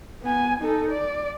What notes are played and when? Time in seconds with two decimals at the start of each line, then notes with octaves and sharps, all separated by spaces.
0.22 B3 G#5
0.60 D#4 A4
0.91 D5